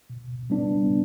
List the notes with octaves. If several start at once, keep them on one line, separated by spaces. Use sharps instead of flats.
B2
G3 B3 D4